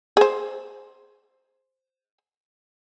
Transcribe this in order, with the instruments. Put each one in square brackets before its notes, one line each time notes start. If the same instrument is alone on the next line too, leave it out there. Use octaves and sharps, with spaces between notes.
[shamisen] G#4 C5